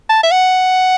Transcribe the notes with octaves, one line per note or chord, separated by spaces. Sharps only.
A5
E5
F#5